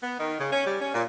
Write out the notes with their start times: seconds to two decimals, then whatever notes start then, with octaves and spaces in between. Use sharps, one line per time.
0.03 B3
0.18 D#3
0.39 C#3
0.52 C#4
0.66 G3
0.80 C#4
0.94 A#2